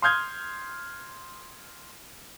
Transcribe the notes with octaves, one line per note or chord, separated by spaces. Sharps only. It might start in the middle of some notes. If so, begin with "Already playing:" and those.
C6 D#6 F6 G6 G#6